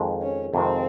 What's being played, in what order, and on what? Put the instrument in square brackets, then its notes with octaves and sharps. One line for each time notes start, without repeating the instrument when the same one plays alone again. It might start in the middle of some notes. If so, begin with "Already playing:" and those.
Already playing: [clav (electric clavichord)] F2 D#3 G#3
[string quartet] C#4
[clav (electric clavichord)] F2 C3 D#3 G#3 [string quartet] C4